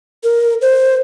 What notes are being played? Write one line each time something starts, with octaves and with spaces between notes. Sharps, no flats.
A#4
C5